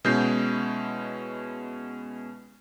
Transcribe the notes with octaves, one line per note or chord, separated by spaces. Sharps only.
B2 G#3 C#4 E4 G6 C7